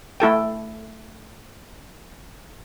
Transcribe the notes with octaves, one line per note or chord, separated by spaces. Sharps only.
A3 E4 A4 G5